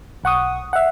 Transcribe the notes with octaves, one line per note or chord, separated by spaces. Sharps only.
B1 F#5 C#6 D#6
E5 F#5